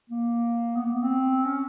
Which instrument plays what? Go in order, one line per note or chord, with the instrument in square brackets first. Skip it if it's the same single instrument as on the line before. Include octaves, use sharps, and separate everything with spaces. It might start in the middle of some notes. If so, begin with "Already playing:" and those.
[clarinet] A#3
B3
A#3
B3
C4
C#4